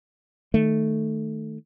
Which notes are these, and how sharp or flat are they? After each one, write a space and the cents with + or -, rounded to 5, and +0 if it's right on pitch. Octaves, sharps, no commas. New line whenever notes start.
D#3 +0 A3 +0